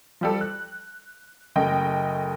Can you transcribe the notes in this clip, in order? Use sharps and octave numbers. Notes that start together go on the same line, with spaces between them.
F3 G3 A4
F#6
F#1 C#3 A3 D#5 G5